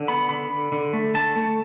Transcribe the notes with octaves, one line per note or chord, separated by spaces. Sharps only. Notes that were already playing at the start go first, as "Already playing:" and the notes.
Already playing: D3
B3 B5
D3 B5
D3
D3
A3
D3 A5
A3